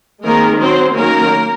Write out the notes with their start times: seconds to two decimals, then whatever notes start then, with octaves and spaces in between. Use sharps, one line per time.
0.24 D#3 G#3 A#3 C4 A#4
0.59 F#3 C4 C#4 C5
0.94 D#3 F#3 A#3 C#4 A#4